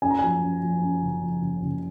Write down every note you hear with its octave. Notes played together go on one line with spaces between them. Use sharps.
F#2 G#5
A#5
F3 G#5
F#2
F3
F#2
F#1
F3
F#1
F#1